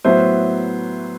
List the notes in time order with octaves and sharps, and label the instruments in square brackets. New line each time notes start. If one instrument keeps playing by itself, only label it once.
[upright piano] A2 F#3 B3 C5 E5